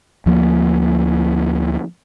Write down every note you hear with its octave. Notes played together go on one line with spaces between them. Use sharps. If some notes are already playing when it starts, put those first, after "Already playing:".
D2 F3 G3 A#3